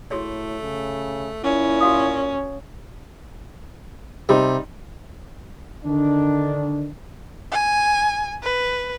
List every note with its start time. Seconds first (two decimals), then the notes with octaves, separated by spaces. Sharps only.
0.11 A2 A3 F#4 G#4 C#5
0.63 C#3
1.44 A#2 C#4 E4
1.80 F#4 F5 D#6
4.29 C3 G3 D#4
5.85 D3 D#3 D4
7.52 G#5
8.43 B4